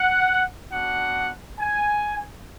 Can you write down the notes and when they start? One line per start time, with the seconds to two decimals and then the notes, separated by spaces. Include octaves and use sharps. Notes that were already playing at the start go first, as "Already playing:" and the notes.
Already playing: F#5
0.69 B3 D4 F#4 F#5
1.59 G#5